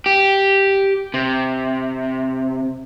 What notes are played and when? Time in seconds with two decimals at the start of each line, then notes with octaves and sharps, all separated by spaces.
0.06 G4
1.14 C3